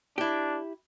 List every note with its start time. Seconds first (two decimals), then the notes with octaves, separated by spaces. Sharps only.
0.18 D4 E4 G4